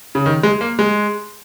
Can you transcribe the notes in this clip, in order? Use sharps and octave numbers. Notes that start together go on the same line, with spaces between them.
C#3
D#3
G#3
A#3
G#3